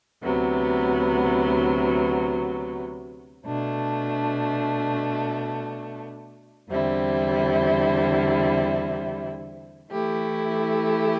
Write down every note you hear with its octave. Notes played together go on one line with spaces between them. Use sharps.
D2 C3 F#3 B3
B2 A3 D4
E2 D3 G3 C4 E4
E3 A3 E4 G4